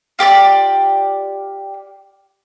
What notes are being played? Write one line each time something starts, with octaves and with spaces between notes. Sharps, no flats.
F4 G4 C#5 D5